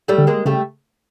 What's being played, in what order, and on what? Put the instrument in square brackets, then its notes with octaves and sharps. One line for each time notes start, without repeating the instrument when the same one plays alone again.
[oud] G3 A3
[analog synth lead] D3
[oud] G#3 A#3
[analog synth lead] C#3 [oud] G3 A3